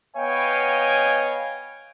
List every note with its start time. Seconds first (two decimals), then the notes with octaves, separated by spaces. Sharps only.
0.17 B3 C#5 D#5 F5 G5 G#5